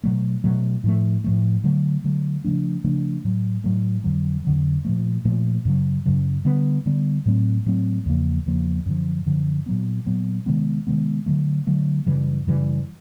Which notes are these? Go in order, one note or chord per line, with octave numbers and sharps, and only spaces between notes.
B2 F#3 A3
B2 F#3 A3
A2 F3 A3
A2 F3 A3
D3 F#3 A3
D3 F#3 A3
C#3 F3 A3 D4
C#3 F3 A3 D4
A2 F#3 A3
A2 F#3 A3
F2 D3 F#3
F2 D3 F#3
A#2 F3 A3
A#2 F3 A3
F#2 C#3 F#3
F#2 C#3 F#3
D3 G3 B3
D3 G3 B3
A2 F#3 A3 C4
A2 F#3 A3 C4
E2 C#3 F3 A#3
E2 C#3 F3 A#3
F#2 D3 F3
F#2 D3 F3
A#2 F#3 B3
A#2 F#3 B3
C3 D#3 G#3 B3
C3 D#3 G#3 B3
D3 F#3 A3
D3 F#3 A3
F#2 C#3 E3 G3
F#2 C#3 E3 G3